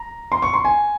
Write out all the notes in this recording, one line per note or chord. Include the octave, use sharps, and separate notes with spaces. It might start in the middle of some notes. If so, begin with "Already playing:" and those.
Already playing: A#5
C6
C#6
C6
G#5